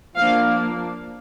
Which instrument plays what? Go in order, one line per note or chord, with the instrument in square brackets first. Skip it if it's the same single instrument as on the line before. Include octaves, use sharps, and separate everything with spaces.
[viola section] F3 A#3 D4 F5